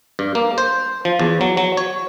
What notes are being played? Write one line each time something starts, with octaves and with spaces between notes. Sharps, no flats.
G2
A#3
C5
F3
E2
F#3
F#3
C#5